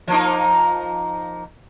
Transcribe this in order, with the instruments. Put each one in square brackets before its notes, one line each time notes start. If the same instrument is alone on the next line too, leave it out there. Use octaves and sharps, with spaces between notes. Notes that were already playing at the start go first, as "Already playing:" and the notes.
[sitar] F3 A#3 D#4